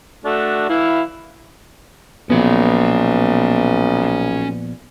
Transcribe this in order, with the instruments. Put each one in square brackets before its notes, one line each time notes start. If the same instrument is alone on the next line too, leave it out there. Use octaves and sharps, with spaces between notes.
[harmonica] A3 D4 F#4
E3 E4 F5
[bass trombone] B1 [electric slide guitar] A#2 F3 B3 [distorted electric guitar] C#4 B5